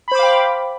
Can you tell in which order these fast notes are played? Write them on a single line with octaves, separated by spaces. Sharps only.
B5 C5 D6 F5 G5